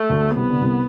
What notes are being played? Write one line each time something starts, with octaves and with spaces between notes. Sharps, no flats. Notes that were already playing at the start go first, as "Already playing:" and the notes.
Already playing: A3
D2 D3
C2 C3 B3
D3
C2 C3